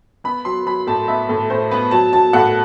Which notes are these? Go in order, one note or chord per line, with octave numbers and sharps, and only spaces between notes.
B3 B5
F#3 C6
F#3 B5
A2 A5
B3 E5
A2
A2 C5
B3 B4
F#3 A5
F#3 A5
A2 F#5